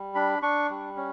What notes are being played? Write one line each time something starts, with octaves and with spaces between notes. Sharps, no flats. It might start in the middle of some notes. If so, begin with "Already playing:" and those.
Already playing: G3
D4 B5
D4 C#6
G3
C#4